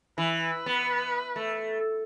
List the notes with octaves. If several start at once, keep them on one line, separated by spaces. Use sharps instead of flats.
E3 B4
B3
A3